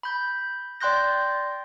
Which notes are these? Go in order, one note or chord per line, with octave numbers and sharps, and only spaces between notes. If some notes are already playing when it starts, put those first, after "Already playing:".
B5 G6
D5 G5 C6 F#6 G6 A#6